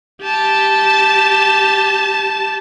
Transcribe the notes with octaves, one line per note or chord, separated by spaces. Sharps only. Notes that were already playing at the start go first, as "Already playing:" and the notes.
G4 A5